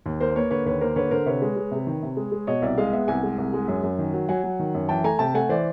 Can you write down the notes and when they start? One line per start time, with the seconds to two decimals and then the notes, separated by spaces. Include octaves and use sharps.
0.06 D#2
0.21 A#3 A#4 C5
0.36 A#3 B4 C#5
0.51 D3 B4 C#5
0.66 D#2 B4 C#5
0.81 A#3 A#4 C5
0.96 D3 B4 C#5
1.11 D3 A#4 C5
1.26 C3 B4 C#5
1.42 G#3
1.57 G#3
1.71 C3
1.87 D#3
2.03 C3
2.17 G#3
2.32 G#3
2.47 B2 C#5 D#5
2.62 C2 D5 E5
2.78 G#3 D#5 F5
2.93 B3 E5 F#5
3.08 C2 F#5 G#5
3.23 G#3
3.38 C2
3.54 G#3
3.68 F#2
3.83 F#2
3.99 D#3
4.14 F#3
4.29 F#3 F#5 G#5
4.44 F#3
4.59 D#3
4.75 F#2
4.89 E3 G5 A5
5.04 A3 G#5 A#5
5.19 C3 G5 A5
5.34 A3 F#5 G#5
5.49 E3 C5 D5